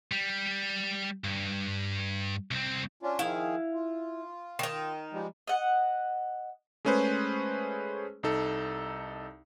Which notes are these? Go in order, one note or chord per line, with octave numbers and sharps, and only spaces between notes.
G3
G2
C2 C4
C#4 D4 F4
D#3 F3 E4 G#4 F5
F4
D#3 D#4
F3 G3 G#3
D#5 F#5
G#3 A3 C#4 G#4 B4 C5
C2 D#4 A4